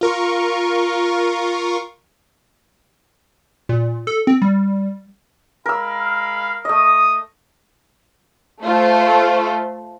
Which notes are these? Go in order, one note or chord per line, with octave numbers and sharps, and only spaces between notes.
F4 A#4 C#6
A#2
A4
C4
G3
G#3 A#4 F5 B5 E6
A3 D#5 D#6
A3 F4 A4 C5